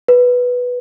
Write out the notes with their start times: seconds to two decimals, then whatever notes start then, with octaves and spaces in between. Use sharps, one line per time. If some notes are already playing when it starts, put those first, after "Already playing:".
0.08 B4